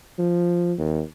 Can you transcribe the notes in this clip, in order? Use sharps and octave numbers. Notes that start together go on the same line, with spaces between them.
F3
D#2